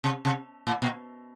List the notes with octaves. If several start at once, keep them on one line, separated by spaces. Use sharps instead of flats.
C3
C3
A2
A#2